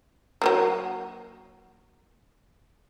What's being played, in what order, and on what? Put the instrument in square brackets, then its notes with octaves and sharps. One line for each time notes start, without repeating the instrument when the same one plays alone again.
[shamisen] F#3 A3 A#3